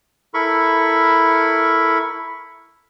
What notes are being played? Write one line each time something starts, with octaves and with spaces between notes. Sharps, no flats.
E4 A4 A#4 B5 C#6